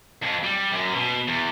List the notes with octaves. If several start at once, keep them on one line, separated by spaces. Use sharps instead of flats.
F2
G3
F#2
B2
E2